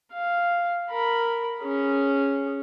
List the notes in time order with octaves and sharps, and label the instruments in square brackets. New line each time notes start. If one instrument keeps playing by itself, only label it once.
[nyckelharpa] F5
A#4 B5
C#4 G#4